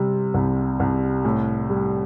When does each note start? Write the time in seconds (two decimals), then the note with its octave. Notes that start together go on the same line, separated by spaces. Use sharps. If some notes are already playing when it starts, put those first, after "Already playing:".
Already playing: C3 G3
0.34 C2
0.80 C2
1.25 A2
1.70 G3